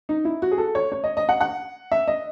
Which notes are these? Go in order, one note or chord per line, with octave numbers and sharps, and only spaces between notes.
D#4
E4
F#4
G#4
A4
C#5
C#5
D#5
D#5
F#5
F#5
E5
D#5